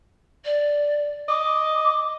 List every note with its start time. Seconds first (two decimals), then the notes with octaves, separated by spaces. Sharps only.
0.44 D5
1.28 D#5 D6